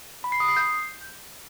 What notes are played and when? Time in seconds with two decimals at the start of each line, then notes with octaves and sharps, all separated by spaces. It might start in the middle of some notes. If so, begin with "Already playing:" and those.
0.24 B5
0.32 C7
0.40 D#6
0.48 C7
0.57 G6